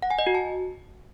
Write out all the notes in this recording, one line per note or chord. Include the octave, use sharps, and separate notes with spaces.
F#5
G#5
D#5
F#4
A5